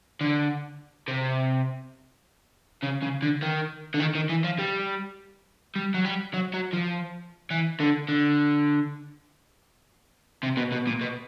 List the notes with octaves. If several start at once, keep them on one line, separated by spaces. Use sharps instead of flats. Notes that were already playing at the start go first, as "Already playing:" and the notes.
D3
C3
C#3
C#3
D3
D#3
D3
D#3
D#3
E3
F3
G3
G3
F#3
G3
F#3
F#3
F3
E3
D3
D3
C3
B2
B2
A#2
B2